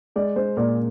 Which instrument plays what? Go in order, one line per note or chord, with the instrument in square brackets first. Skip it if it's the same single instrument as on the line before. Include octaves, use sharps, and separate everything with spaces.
[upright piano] G#3 [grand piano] D5
[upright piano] G#3 [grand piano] C5
[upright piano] A#2 [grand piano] D5